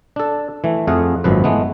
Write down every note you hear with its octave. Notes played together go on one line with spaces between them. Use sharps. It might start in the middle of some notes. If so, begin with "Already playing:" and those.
D4 A4
E3 A3
F2 A3 G#4 F5 F#5
G#1 F#2 F3 B4
E3 G#3 A3 B3